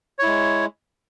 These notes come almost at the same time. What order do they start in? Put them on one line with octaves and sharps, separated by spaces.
C#5 E4 G#3